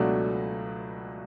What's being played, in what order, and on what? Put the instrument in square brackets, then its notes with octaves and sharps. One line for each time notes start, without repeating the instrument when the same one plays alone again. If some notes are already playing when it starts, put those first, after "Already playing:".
Already playing: [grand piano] C#2 B2 F#3 A3 D4